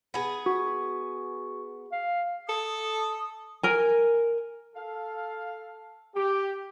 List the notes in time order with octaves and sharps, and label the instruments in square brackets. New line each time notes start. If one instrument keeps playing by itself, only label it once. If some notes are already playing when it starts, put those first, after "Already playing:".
[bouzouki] B3 G#4
[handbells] F#4
[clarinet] F5
[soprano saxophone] A4 [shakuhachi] D#6
[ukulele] A#4 G#5
[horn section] A4 F5
G4